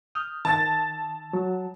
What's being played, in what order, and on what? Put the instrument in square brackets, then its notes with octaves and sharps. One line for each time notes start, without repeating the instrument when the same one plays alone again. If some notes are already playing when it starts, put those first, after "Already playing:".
[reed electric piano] D#6 F6 G6
[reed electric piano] D#3 [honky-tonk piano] A5 A6
[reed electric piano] F#3